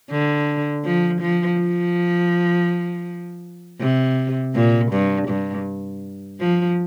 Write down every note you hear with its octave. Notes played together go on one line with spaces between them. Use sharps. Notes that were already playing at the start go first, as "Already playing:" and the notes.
D3
F3
F3
F3
C3
A#2
G2
G2
F3